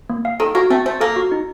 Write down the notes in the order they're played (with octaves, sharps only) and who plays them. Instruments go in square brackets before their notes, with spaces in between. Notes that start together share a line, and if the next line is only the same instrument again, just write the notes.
[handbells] A#3
F5
[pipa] D#3 [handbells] A4
[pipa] A#3 [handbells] F#4
[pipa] A3 [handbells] C4
[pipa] A3 [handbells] C5
[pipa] A#3 [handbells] A4
[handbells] F#4
D#4